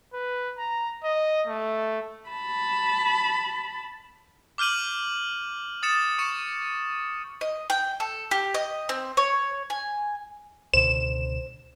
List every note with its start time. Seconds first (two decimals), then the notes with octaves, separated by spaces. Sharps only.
0.14 B4
0.58 A#5
1.04 D#5
1.47 A3
2.30 A5 B5
4.58 D6 F6 G6 D#7 F#7
5.83 D#6 A6 C#7 E7
6.19 C#6 C#7 E7
7.41 D#5
7.70 G5
8.00 A4
8.31 G4
8.54 D#5
8.89 C4
9.17 C#5
9.70 G#5
10.74 C#2 B2 D3 C5 E7